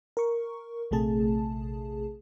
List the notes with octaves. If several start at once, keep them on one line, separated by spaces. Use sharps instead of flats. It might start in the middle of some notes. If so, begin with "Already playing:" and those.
A#4 C#6
A#1 C3 A3 G#4 A5